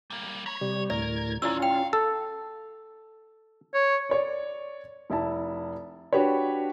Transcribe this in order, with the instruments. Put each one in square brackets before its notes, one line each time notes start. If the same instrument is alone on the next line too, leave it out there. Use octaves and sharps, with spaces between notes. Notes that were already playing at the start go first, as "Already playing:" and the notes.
[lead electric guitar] G3 A#3
[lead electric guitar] C#5 [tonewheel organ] A#5 B5
[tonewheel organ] C3 G3
[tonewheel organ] D2 A2 G#6 [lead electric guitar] A#4 [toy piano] D5
[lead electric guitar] D#3 F#3 [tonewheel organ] C#4 F4 [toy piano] E4 D5 E6
[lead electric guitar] F5 [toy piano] G5
[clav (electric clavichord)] A4
[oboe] C#5
[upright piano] C#5 D5
F1 E4 A5
D4 F#4 G4 B4 C#5